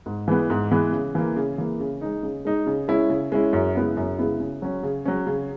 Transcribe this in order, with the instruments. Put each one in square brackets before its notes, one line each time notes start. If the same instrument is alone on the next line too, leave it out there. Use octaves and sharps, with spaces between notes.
[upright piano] G#2
E3 G#3 B3
G#2
E3 G#3 B3
C#3
E3 A#3
C#3
E3 A#3
C#3
G#3 D#4
C#3
G#3 D#4
C#3
G#3 C#4 E4
C#3
G#3 C#4 E4
F#2
C#3 G#3 B3 E4
F#2
C#3 G#3 B3 E4
C#3
F#3 C#4
C#3
F#3 C#4
C#3